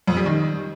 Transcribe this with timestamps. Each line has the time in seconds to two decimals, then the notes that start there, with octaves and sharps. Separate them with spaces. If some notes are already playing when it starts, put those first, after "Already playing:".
0.07 F2
0.17 G3
0.26 D#3